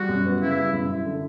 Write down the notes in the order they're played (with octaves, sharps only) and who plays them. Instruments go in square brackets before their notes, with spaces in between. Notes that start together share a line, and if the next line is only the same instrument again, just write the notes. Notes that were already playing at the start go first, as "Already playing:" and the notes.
Already playing: [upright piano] G3 [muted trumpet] F#4
[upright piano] F#2
B3
[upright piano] C#3 [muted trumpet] E4
[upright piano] G3
F#2
E4
D3